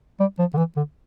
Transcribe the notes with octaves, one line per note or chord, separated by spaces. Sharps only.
G3
F3
D3
E3
D3